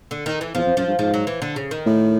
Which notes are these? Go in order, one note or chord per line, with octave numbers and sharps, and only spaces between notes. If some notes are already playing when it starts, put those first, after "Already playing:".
D3
D#3
E3
E2 F3
F2
F#2 F3
G2
G#2 F3
F#3
E3
D3
C#3
D#3
A2